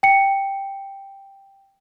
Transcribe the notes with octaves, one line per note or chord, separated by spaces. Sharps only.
G5 C#7